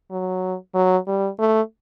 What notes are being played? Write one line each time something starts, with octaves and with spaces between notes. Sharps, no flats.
F#3
F#3
G3
A3